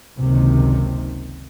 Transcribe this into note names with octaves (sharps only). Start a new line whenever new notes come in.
F#1 C#2 C3 D#3